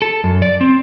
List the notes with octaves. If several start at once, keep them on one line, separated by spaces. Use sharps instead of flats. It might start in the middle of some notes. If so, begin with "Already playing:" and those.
A4
F#2
D5
C4